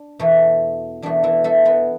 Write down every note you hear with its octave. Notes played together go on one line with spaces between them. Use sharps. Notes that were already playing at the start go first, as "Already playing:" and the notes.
Already playing: D4
E2 B2 A3
E2 B2 A3 D4
E3 E4
A3 A4
B3 B4